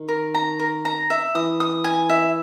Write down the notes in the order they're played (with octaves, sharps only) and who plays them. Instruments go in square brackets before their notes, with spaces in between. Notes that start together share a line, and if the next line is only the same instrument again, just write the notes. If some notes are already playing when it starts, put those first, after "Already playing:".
Already playing: [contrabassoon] D#3
[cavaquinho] A#4
A#5
A#4
A#5
E5
[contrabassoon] E3 [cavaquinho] D#6
[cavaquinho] D#6
G#5
E5